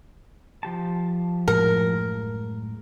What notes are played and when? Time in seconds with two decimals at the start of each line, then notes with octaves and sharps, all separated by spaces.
0.63 F3 G4 A5
1.48 F#2 A2 G#3 A#4